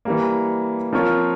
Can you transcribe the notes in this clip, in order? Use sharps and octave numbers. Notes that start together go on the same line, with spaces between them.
E3 G3 A#3
F3 C4 F4 A#4 C#5